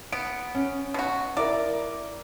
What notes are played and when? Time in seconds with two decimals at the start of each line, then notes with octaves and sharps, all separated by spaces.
0.12 B3 D7
0.55 C#4
0.94 B2 F#4
1.37 E4 A#4 D5